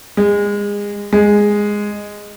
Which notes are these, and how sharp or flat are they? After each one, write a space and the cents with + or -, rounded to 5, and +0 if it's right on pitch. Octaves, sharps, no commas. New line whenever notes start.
G#3 -25
G#3 -5